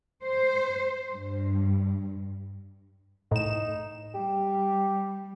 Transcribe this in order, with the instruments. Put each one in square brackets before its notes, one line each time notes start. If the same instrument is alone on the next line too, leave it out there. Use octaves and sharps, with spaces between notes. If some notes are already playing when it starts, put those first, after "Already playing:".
[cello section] C5
G2
[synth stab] A2 E7 [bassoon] D#4
[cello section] G3 [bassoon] G4